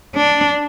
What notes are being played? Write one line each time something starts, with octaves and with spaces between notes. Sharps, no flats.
D4